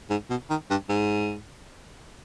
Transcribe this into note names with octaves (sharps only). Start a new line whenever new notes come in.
G#2
B2
D#3
G2
G#2